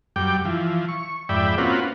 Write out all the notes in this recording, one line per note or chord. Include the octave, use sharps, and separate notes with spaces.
F#2 G3 G5 D6
E3 F3
C#6
F2 G#2 D5 E5 G5 B5
A#3 C4 C#4 F4 F#4 B4